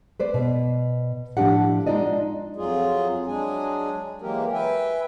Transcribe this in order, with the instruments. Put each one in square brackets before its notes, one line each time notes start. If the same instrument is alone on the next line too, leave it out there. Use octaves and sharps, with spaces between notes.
[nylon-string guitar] B4 C5 D5
B2 B3
A2 F3 A3 D4 G4 F#5
G#3 D4 D#4 F4 D5 D#5
[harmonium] F2 F#3 F4 G#4
F#3 G#3 D4 G#4 G#5
E3 F#3 G#3 A#3 G4 A#4
B4 E5 G5 G#5